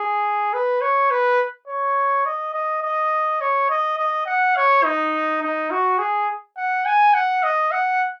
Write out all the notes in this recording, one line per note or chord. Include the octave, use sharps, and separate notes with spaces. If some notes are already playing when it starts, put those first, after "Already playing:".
Already playing: G#4
B4
C#5
B4
C#5
D#5
D#5
D#5
C#5
D#5
D#5
F#5
C#5
D#4
D#4
F#4
G#4
F#5
G#5
F#5
D#5
F#5